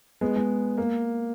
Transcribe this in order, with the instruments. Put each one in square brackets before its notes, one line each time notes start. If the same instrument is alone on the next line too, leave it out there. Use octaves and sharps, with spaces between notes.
[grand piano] G#3 B3
G#3 B3
A#3